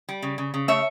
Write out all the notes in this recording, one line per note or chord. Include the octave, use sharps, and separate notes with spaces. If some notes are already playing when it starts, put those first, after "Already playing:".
G3
C#3
C#3
C#3
A3 C#5 E5